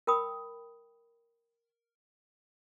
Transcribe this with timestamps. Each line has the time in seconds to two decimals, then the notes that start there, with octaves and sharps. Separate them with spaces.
0.07 A#4 G5 B5 D#6